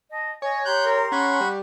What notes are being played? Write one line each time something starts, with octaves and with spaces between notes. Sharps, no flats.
D#5 A5
C#5 D#5 G#5
G4 A#5 C6 F#6 G6
A#4
C#4 F#5 B5 C#6
G3